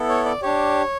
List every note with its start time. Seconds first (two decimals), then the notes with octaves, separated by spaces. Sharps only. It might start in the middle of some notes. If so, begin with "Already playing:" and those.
Already playing: B3 E4 A4
0.09 C#5
0.25 D5
0.42 D4 G4 C#5